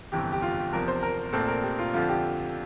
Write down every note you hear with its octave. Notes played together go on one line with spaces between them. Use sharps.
G1 F2 C3 E3 G4
G4
F4
G4
E2 C3 F3 A#4
C5
A#4
A#1 A#2 A3 C4 A4
A#4
G4
F4
F2 D3 F3 F4
G4